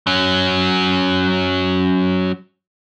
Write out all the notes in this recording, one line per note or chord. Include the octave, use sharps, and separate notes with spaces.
F#3 C#4